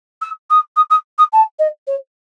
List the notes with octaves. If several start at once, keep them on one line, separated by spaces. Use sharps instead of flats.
E6
D#6
D#6
D#6
D#6
A5
D#5
C#5